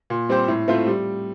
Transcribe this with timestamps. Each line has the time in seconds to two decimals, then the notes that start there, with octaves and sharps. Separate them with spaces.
0.10 A#2
0.29 G3 C4 G4 C5
0.48 A2
0.68 A3 C4 F4 C5
0.87 G3